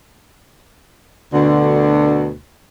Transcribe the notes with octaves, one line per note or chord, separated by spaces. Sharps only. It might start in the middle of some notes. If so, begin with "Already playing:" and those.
D2 B2 D3